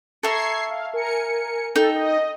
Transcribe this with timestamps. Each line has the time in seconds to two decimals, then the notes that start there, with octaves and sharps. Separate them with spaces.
0.23 A4 E5 A#5 C#6 G#6 C7
0.70 F5
0.94 A#4 G#5 C#7
1.76 D#4 A4 G5
1.95 D#5